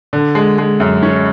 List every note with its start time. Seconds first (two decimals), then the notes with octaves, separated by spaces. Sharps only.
0.13 D3
0.35 G#3
0.58 G#3
0.80 F#2
1.03 C#4